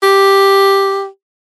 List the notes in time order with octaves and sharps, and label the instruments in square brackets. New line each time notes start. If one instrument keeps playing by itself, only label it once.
[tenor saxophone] G4